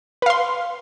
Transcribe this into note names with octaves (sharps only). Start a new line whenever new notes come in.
B4 F5 C6